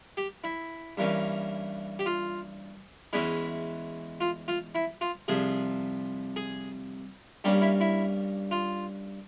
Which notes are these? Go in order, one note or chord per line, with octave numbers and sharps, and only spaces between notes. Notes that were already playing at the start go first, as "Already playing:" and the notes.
G4
E4
G2 E3 A#3 C#4
G4
F4
E2 E3 G#3 C#4 E4
F4
F4
E4
F4
C2 C3 F3 G#4
G#4
G2 G3 A#3 C#4 G4
E4
E4
F4